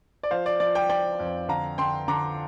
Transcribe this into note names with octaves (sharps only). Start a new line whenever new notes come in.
D5
F3 C5 F5
D5
F3 D5
D5 G5
F3 D5 G5
F2
D3 F5 A#5
D3 G5 C6
D3 A#5 D6